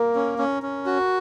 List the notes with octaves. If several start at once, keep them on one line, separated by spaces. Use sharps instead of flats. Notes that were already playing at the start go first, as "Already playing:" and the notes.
Already playing: A#3 A#4
C#4
C#4
C#4
F#4